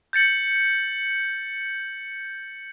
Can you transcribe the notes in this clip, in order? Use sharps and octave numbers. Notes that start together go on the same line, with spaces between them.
G6 A6 C#7 F#7